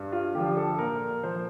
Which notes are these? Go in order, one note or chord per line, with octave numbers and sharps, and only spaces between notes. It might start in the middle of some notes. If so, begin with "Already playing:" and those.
Already playing: G2
F4
D3 F3 G4
A4
A#2 A#4
F3 C5